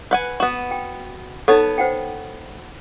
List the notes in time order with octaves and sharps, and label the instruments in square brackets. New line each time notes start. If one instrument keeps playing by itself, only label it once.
[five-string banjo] B4 F#5 G#5
B3 F#4
[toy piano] G5
[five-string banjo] B3 C#5 A5 [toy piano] D#4 A4
[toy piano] C5 F#5 G5